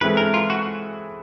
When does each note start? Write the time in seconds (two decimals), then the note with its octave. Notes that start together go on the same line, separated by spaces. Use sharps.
0.01 E3 G#3 C4 E4 A4 B4
0.17 A#4
0.34 F4
0.50 F#4